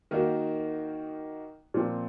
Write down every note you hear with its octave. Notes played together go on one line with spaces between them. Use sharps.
D#3 A#3 D#4 F#4
A#2 F3 C4